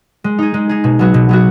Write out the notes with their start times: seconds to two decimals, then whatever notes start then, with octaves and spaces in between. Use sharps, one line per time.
0.24 G#3
0.38 D#4 G#4
0.54 G#3
0.69 D#4 G#4
0.84 B2
0.99 F#3 B3 F#4
1.14 B2
1.29 F#3 B3 F#4